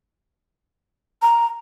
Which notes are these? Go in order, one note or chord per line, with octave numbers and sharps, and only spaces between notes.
A#5